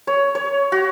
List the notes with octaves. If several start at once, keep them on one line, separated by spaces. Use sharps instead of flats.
C#5
C#5
F#4